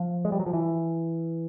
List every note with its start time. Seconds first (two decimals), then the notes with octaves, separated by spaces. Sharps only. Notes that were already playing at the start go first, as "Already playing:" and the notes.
Already playing: F3
0.25 G#3
0.32 G3
0.40 F#3
0.46 F3
0.53 E3